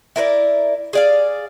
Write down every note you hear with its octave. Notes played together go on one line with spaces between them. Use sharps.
E4 A#4 B4 D5
G#4 D5 F5